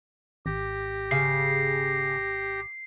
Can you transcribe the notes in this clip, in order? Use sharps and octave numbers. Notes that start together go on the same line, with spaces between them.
G#1 G4 A#6
C#3 C7